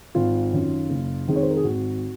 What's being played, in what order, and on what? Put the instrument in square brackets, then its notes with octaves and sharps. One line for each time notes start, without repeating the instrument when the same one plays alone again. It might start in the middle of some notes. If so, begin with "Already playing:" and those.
[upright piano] G#1 F4
F#2 D#3
F#1
F2 D#3 G#3
C#5
C5
A#4
G#4
G#1 F#4